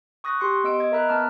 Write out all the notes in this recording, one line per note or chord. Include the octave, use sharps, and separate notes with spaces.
C#6 D#6 F#6 A#6
G4 C6 C#7
B3 D#5 E6 D7
D#5 G#6 D7
A#4 E5 A#5 B5 E6 F#6
B3 A5 D6 F6